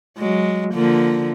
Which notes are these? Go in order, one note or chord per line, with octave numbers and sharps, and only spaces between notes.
F#3 G#3
D3 F3 A#3